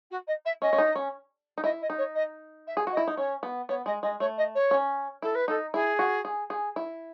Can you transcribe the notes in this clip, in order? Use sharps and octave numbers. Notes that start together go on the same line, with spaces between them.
F#4
D#5
E5
C#4 D#5
C#4
D#4
C#4
D#4
E4 D#5
D#5
D#4
C#5
D#5
E5
G#4
F#4
D#5
E4
D#4
C#4 C#5
B3
B3 C#5
G#3 D#5
G#3 D#5
A3 C#5
D#5
C#5
C#4
E4 A4
B4
D#4 A4
E4 G#4
F#4
G#4
G#4
E4